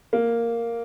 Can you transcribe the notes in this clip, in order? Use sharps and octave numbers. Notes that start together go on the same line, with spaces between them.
A#3